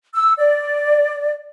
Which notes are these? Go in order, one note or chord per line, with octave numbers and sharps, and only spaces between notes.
E6
D5